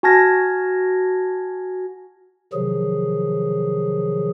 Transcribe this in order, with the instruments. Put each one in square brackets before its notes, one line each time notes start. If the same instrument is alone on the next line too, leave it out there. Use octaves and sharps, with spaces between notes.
[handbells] F#4 G#5 A5 F6 G#6 A#6
[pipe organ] C3 D#3 F3 F#3 G#4